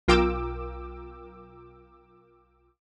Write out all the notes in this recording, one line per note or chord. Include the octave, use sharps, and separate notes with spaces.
B1 F4 A#4 G5 D6 E6